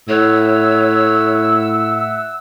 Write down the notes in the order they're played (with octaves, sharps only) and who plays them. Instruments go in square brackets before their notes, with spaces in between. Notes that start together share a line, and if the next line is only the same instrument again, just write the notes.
[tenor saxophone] A2 [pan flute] C#5 [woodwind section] E5 F#5 E6